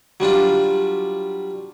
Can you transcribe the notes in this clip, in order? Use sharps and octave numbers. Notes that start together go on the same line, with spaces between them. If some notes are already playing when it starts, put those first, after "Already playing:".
F#3 G3 D4 F4